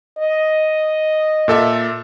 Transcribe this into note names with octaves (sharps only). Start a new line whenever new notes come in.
D#5
A#2 A4 E5